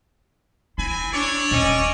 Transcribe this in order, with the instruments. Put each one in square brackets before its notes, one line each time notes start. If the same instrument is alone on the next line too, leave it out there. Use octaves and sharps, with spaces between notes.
[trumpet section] C4 G#5 B5 [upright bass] E4
[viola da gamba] D4 [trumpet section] A4 C#5 D5
[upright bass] D#1 [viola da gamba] C#4 D#5